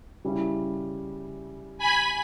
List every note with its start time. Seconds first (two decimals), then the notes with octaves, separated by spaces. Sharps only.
0.24 C#3 G3 C#4 E4
1.78 G#5 B5